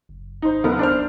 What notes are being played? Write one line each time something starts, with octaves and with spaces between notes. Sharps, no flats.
F#1
G#1 D#4 C5
F#1 D#2 B3 A#4
D4 C5 F6
E1